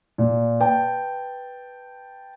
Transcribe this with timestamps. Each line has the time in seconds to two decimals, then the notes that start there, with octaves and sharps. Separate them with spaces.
0.18 A#2
0.60 B4 G5 A5